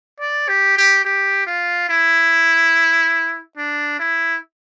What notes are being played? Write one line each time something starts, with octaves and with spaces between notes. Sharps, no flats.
D5
G4
G4
G4
F4
E4
D4
E4